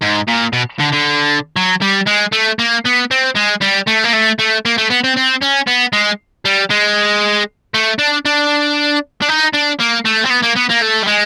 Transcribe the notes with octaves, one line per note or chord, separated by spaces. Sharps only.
G#2
A#2
B2
D3
D3
F#3
G3
G#3
A3
A#3
B3
C4
G#3
G3
A3
A#3
A3
A3
A#3
A3
B3
C4
C4
C#4
B3
G#3
G3
G#3
A3
D4
D4
D4
D#4
D4
A#3
A3
C4
B3
A#3
B3
A#3
A3
G3
G#3